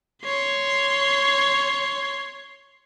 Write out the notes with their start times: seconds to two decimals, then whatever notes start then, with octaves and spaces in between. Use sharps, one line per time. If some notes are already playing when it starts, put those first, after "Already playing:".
0.24 C#5 C6